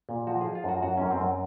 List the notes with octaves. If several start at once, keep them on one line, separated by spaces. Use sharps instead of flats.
A#2
F3 F#4
F3 G#4
F4
F#2 F#4
F#2 F#4
F#2 C#4
C4
F#2